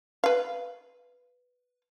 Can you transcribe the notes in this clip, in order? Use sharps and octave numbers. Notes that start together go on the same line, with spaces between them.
B4 F5